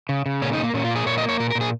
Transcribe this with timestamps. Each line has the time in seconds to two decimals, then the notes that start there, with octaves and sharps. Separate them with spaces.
0.09 C#3
0.26 C#3
0.42 A#2 C#4
0.53 D#4
0.58 A#2
0.64 A#3
0.74 A#2 C#4
0.85 F4
0.91 A#3 G#4
1.06 A#2 C#5
1.18 D#5
1.23 A#3
1.29 C#5
1.40 A#2 A#4
1.50 A#4
1.55 A#2
1.61 G#4